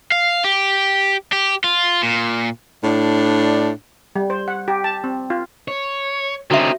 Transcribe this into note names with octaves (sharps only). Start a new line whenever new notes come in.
F5
G4
G4
F4
A#2
A2 D4
G3
C5
F#5
G4
A5
C4
F4
C#5
D3 C4 C#4 D#4 F#4 E5